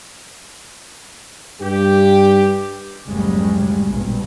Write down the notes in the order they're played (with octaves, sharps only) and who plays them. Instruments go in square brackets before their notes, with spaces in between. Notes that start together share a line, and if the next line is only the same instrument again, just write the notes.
[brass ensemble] G2 G4
[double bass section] F#1 D2 A2 C#3 G3 G#3
A#1 G2 B2